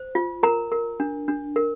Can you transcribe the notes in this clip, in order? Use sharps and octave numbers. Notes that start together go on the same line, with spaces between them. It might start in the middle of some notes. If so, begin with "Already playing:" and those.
Already playing: C5
F4
A#4 A#5
A#4
D4
D4
A#4